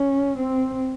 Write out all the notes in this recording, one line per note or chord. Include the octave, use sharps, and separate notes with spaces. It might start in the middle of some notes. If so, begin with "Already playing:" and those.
Already playing: C#4
C4